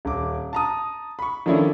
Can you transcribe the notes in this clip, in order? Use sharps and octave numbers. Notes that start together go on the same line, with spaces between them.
D#1 D6
A5 A#5 D#6
B5 C#6
D#3 F3 A3 C#4 D4 E4